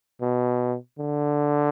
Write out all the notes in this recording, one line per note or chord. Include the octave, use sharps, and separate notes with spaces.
B2
D3